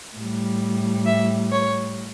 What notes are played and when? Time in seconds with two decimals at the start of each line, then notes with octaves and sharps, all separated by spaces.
0.16 A2 G3
1.06 E5
1.51 C#5